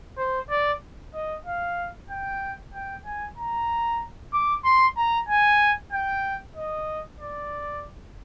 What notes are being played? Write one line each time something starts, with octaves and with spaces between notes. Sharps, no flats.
C5
D5
D#5
F5
G5
G5
G#5
A#5
D6
C6
A#5
G#5
G5
D#5
D5